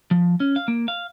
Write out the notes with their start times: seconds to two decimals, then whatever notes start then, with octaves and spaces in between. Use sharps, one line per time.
0.11 F3
0.40 C#4
0.56 F5
0.68 A#3
0.88 F5